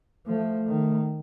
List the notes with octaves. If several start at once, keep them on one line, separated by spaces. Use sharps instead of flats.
F3 A3
D#3